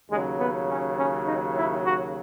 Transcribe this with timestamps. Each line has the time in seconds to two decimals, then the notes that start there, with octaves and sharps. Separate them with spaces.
0.10 D#2 C#3 F#3 G#3
0.39 B3
0.69 C#4
0.98 C#4
1.27 D#4
1.56 E4
1.85 F#4